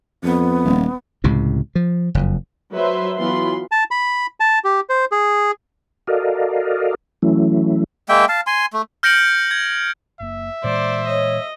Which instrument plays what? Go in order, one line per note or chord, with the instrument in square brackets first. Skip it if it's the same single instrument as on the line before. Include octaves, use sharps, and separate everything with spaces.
[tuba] F2 [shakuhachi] B3
[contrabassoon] D#1
[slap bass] C#2 A2 C3
F3
F#1 F2
[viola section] F#3 B4 C5 E5 C6
E3 F#3 B3 F4 B5 C6
[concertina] A5
B5
A5
G4
C5
G#4
[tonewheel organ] F#4 A4 A#4 D5 D#5 F5
E3 F#3 A3 C#4 E4
[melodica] G#3 A#3 E5 G5
F5 A5
G#5 C6
A3
[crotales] F6 G6 A#6 C#7 D7 F#7
G#6
[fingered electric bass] F#1 A#3 [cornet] E5
[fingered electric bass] A#2 E3 G#3 [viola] C5 D5
[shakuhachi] C#5 [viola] D#5